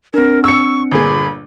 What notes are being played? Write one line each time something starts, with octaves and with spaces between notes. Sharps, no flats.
C4 D4 A#4
C#6 E6 C#7
G1 A#2 G#4 B5